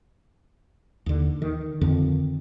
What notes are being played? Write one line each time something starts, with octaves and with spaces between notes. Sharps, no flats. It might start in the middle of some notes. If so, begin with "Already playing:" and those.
D#2 D3
D#3
F2 D3 D#3